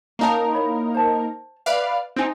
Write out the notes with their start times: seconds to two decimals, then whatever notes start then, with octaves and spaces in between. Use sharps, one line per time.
0.19 A#3 C#4 D#4 A#4 A5
0.53 E4 C#5 B5
0.94 C5 A5
1.66 B4 D5 E5 F5
2.16 C4 D#4 C5 G#5